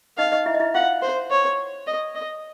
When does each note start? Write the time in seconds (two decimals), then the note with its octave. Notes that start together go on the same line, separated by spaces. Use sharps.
0.18 D#4 D#5 F5
0.32 D#4 D#5
0.46 E4 E5
0.54 D#5
0.60 E4 E5
0.74 F4 F5 F#5
1.02 C5
1.31 C#5
1.87 D#5
2.15 D#5